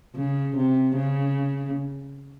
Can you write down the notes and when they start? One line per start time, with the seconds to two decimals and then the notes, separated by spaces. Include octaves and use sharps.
0.15 C#3
0.56 C3
0.95 C#3